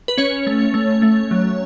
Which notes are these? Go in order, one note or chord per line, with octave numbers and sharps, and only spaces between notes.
B4
C#4 C#5
A3
A3
A3
F#3